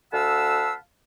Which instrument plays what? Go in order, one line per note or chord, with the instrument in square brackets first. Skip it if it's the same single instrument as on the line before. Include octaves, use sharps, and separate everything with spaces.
[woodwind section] D2 F5 F#5 A5 B5 E6